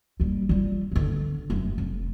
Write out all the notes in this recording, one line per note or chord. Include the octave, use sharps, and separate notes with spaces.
D#2 G3
G3 F4
D3 B3
F1 F#2
F1